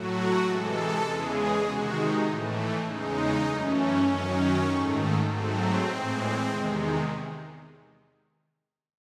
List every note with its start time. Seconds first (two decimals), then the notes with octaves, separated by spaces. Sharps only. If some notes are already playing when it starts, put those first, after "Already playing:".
Already playing: A2 F#3 A3 F#4
0.42 C3 E3 G#3 A4
1.03 E2 C#3 E3 G#3 G#4
1.63 C3 D#3 G#3 F#4
1.94 D#4
2.24 A2 E3 A3
2.84 E2 C#3 G#3 D#4
3.45 F#2 E3 A3 C#4
4.06 F#2 D#3 F#3 C#4
4.66 G#2 D#3 A3
5.27 G#2 F#3 A3 C4
5.87 A2 E3 G#3
6.49 E2 C3 D#3 G#3